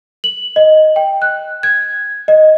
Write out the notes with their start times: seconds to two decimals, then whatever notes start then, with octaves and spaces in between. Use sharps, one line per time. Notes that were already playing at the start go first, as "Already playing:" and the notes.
0.24 F#7
0.56 D#5
0.96 G5
1.22 F#6
1.63 G#6
2.28 D#5